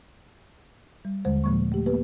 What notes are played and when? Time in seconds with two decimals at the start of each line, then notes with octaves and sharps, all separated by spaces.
1.05 G3
1.25 D#2 D3 G#3 C5
1.44 A#2 F3 G#3 A#3 C#6
1.72 A3 G4
1.86 A#3 B3 G4 B4